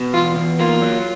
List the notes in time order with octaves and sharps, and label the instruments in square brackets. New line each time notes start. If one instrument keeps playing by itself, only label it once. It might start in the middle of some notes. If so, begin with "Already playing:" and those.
Already playing: [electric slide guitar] B2
[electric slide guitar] E2 [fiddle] F4
[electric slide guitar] E2
[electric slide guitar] A#3 [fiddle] F4
[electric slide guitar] F#3